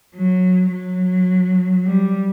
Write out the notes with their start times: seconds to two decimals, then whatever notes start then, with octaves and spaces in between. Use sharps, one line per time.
0.16 F#3
0.72 F#3
1.86 G3